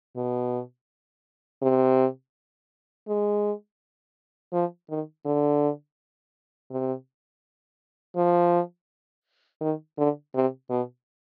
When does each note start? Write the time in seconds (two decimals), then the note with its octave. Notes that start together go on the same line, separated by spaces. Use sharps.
0.16 B2
1.62 C3
3.08 G#3
4.53 F3
4.89 D#3
5.26 D3
6.71 C3
8.16 F3
9.61 D#3
9.98 D3
10.35 C3
10.70 B2